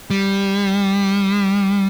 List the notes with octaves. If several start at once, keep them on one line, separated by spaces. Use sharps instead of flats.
G3